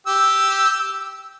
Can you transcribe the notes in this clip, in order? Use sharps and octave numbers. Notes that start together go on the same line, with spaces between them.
G4 E6